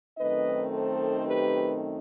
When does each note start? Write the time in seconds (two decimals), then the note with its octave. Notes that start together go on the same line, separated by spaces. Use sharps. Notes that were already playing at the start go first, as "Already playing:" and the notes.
0.18 F#2 D#3 A3 C4 D#4 B4 D#5
0.72 A4 C5
1.26 G4 B4